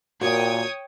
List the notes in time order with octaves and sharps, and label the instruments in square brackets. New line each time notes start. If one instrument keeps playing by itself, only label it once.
[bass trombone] A#2 [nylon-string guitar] F#4 A#4 [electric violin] C#5 [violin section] G5 D#6 G#6